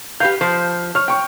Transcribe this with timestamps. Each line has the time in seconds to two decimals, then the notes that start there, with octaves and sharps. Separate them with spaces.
0.20 G4 B4 F5 G6
0.41 F3 C5
0.95 C#5 F6
1.08 G5 C#6